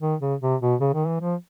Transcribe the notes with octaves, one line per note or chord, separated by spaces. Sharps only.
D#3
C#3
C3
B2
C#3
D#3
E3
F3